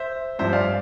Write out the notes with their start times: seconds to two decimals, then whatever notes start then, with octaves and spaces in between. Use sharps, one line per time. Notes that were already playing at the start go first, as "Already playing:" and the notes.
Already playing: C5 E5
0.39 G2 F3 C4 C5 E5
0.52 D5 F5